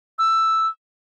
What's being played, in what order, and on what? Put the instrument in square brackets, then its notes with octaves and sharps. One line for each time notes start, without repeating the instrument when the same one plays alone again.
[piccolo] E6